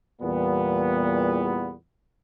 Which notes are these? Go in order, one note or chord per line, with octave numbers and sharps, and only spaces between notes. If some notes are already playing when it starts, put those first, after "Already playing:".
E2 A#2 G3 B3